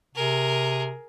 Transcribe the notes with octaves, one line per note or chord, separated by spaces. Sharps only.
C3 G#4 A#4